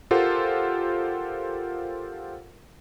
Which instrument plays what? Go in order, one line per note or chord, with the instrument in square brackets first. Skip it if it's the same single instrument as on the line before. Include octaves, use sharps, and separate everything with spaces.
[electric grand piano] F4 G4 A4 A#4 C5 F#5